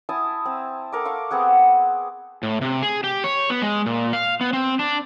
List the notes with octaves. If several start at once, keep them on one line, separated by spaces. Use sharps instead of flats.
E4 G#5 A5 D#6
C4
A4 A#4 D6
F5 C#6 D6
B3 C4 G#4 F#5
A2
C3
G#4
G4
C#5
B3
G#3
A#2
F5
B3
C4
D4